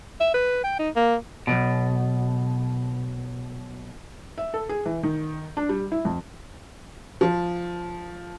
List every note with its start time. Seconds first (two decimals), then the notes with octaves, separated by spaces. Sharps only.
0.20 E5
0.34 B4
0.64 G5
0.79 D#4
0.96 A#3
1.47 B1 E2 B2
4.38 E5
4.54 A4
4.69 G#4
4.86 E3
5.03 D#3
5.57 D4
5.69 G3
5.92 E4
6.05 F2
7.21 F3